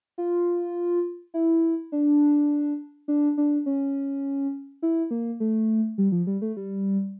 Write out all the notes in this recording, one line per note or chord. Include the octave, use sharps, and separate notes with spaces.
F4
E4
D4
D4
D4
C#4
E4
A#3
A3
G3
F3
G3
A3
G3